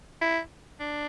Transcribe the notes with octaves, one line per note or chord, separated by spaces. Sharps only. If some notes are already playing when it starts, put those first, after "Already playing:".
E4
D4